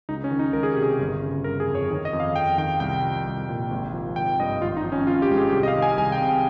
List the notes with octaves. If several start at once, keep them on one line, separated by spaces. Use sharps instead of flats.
C#2 D#4
C#4
D#3
D#4
C#2 A#4
G#4
C3 G4
G#4
G1
C#3
G1 A#4
G#4
F2
C#5
D#3
D#5
F2
F5
F2 G5
D#3 G5
C2 G5
F3
C2
A#2
G#1
F3
G#1 G5
G2 D#5
G#1 F4
D#4
F3
C#4
G#1 F4
G4
G#2
G#4
C2 G4
D#5
F5
D#3
G#5
C2 G#5
G5
C3
G5